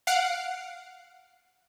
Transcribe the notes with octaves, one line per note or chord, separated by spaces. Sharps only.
F5 F#5 C7 D7